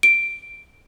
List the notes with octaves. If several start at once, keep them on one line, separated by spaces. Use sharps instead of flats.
D7